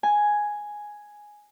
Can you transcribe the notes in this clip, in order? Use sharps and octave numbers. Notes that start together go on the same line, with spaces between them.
G#5